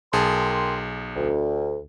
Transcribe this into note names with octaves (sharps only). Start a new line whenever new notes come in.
B1 G#4 A#4 G5 A5 C6
D2